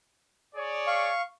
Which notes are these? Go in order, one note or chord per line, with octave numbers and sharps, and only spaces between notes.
G#4 C#5 D5
F5 C#6